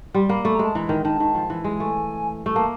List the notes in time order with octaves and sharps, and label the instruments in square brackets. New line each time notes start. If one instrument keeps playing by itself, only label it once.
[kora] G3 [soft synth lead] C6
[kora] A#3 [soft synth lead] B5
[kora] A3 [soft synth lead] B5
[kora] G#3 [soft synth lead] A#5
[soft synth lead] A5
[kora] E3 [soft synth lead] A#5
[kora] D#3
[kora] D#3 [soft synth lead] A5
[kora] D#3
F3
E3
[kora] G#3 [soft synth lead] G#5
[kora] A3
A3
[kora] A#3 [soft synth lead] A5